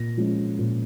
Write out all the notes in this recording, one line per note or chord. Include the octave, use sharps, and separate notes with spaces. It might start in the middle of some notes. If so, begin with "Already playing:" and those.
Already playing: A#2 A#6
F3 G#3 C#4
A#2